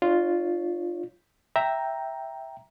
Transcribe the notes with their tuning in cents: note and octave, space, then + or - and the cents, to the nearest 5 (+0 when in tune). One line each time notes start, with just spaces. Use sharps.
D4 +45 F4 +0 C#5 +0
E5 +0 G5 +0 A#5 +0